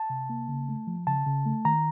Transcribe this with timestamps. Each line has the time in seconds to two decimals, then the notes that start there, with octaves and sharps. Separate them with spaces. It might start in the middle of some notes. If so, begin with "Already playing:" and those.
Already playing: A5
0.10 C3
0.30 A#3
0.49 C#3
0.69 A3
0.87 F3
1.07 C#3 A5
1.26 C#3
1.46 A3
1.65 D#3 A#5